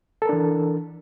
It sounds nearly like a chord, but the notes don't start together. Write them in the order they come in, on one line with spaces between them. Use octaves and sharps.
A4 A#4 D4 E3